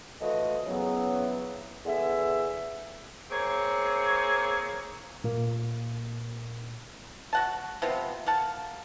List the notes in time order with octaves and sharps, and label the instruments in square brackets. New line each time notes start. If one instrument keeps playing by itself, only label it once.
[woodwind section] A2 D3 E3 F3 F#4 D#5
C#3 E3 F#3 B3
E2 D3 B3 G#4 E5
[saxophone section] A#3 C4 G#4 C#5
[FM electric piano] A#2 A#3
[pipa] F#4 F#5 A5
C3 F3 B3
A#3 F#5 A5